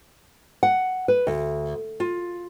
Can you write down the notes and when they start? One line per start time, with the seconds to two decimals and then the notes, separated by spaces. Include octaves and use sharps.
0.63 F#5
1.08 B4
1.27 D2
2.00 F4